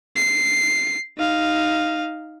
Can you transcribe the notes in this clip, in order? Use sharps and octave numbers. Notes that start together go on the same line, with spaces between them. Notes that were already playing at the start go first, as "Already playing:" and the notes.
C7
D#4 F5